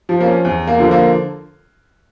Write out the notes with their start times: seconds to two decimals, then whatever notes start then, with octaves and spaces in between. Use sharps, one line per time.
0.09 F3
0.20 A#3
0.26 C#4
0.45 E2
0.67 A#3
0.79 D3 F3
0.91 A#3